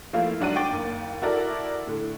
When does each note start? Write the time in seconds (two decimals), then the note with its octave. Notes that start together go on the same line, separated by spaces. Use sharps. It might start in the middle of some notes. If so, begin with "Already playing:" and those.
0.13 F3 A3 A#3 E4 F4
0.40 G#2 F#3 D4 F#4 F#5 D#7
0.56 G5 C#6 D6 A6
0.68 F#1 D#2
1.22 E4 F#4 A4 A#4 D5
1.87 A2 D3